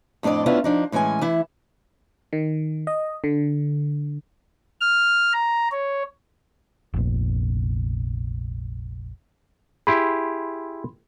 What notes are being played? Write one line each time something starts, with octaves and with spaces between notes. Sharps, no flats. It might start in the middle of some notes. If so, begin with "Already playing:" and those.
F2 A2 D4 D5 D#5
B3 C#4 D4 E4 F4
F3 D4 D#4
A2 E3 G#3 C#4 G#5
E3 E4
D#3
D#5
D3
F6
A#5
C#5
F1 A#1
E4 G4 G#4 B5 C6